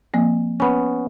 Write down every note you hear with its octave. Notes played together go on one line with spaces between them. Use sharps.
F3 A#3 C4
B3 C#4 B5 C#6